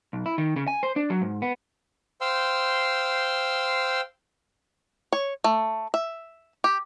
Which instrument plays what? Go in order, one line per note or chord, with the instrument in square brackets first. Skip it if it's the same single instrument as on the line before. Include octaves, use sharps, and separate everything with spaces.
[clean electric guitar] B1
E4
D#3
C#3
G#5
C5
D4
F#3
G#2
B3
[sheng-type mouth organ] C5 F5 G5 C6 E6
[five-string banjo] C#5
A3
E5
G4